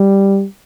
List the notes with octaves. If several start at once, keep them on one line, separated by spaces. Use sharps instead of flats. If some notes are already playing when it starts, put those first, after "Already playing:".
Already playing: G3